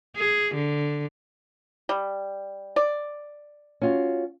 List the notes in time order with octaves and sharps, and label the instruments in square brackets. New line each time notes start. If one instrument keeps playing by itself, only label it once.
[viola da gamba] G#4
D3
[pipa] G3
D5
[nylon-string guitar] C#4 F4 F#4